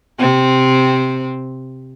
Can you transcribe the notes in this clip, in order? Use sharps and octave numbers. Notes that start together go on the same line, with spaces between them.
C3 C4